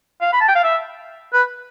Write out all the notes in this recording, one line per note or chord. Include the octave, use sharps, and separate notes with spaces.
F5
B5
A5
G5
F5
E5
B4